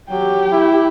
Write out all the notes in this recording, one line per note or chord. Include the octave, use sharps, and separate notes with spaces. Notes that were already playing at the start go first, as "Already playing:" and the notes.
F#3 G4 G5
E4